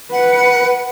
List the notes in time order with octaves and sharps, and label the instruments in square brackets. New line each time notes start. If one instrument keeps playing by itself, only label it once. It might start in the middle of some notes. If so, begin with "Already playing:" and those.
[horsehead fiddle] B4 [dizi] F#5